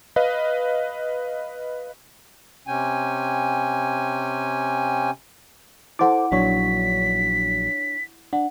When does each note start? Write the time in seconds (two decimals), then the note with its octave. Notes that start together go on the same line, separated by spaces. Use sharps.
0.16 B4 D#5 F5
2.67 C3 C#4 G5 G#5
5.99 E4 A4 C5 F#5 D6
6.32 A#1 F#3 D4 C#5 B6
8.33 D4 F#5